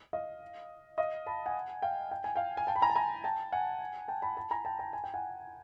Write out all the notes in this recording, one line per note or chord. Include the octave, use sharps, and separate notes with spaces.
D#5 F5
D#5 F5
A5 B5
F#5 G#5
F5 G5
G5
G#5
F5 G5
G#5
G5 A5
B5
G#5 A#5
A5
G#5 A#5
G5 A5
F#5 G#5
G5 A5
A5 B5
A5 B5
G#5 A#5
G5 A5
G5 A5
G#5
G5
F#5 G#5